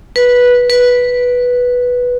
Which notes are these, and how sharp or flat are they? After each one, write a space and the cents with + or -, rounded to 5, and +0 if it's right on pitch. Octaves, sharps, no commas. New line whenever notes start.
B4 -10
B4 -5